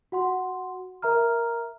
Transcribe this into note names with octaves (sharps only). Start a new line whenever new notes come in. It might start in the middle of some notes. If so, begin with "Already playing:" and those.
F#4 F#5 C6
A#4 E5 A#5 F6